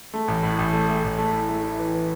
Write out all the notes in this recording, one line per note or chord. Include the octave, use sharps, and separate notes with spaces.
A3
A1
A2
A1
A3
A3
A1
A3
E4
A3
E4
E3
E3